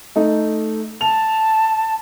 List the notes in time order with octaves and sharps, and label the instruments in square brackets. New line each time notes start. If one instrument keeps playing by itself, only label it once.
[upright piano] A3 D#4
[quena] A5 [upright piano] F7